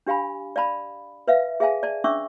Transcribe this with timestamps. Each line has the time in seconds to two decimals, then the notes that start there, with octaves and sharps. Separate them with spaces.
0.07 D4 G4 F5 G#5 B5
0.56 D5 F5 A5 B5
1.28 B4 E5 F5
1.60 G#4 E5 F5 G#5 A5
1.83 D5 A5
2.04 C#4 D4 E5 C#6 D6 E6